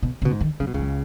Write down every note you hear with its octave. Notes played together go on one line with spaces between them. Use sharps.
B2
C#3
B2
G#2
D#3
C#3 F#3
B2
C#2 C#3 F#3